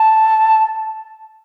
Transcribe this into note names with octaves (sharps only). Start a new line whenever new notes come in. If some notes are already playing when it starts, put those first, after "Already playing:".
Already playing: A5